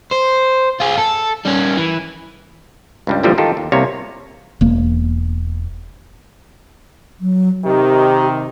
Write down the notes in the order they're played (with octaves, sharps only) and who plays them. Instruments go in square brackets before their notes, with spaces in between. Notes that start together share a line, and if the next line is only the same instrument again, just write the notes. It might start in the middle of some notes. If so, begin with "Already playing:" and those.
[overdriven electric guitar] C5
F4 G#4
A4
G3 C#4
E3
[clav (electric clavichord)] C#2 G2 G3
A#2 D3 E3 F3 G3
D#3 D#4 F4 G4 A4
D#2
C2 C3 A#3 C#5
[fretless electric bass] E1 A#3
[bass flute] F#3
[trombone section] C3 D#3 [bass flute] G4